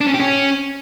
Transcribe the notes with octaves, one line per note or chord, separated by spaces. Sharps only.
D4
C#4
G4
C#4